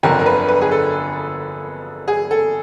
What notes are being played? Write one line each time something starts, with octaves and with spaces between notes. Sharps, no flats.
G1 F2 D3 A#4
A#4
B4
B4
G#4
A4
G#4
A4